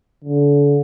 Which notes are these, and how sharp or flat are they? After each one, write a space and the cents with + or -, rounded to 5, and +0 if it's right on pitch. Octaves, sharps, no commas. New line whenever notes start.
D3 -35